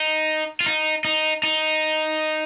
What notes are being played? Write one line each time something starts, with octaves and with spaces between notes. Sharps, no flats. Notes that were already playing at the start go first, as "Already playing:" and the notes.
Already playing: D#4
F4
D#4
D#4
D#4